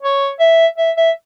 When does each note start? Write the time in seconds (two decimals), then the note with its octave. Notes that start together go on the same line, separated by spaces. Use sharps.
0.03 C#5
0.40 E5
0.78 E5
0.97 E5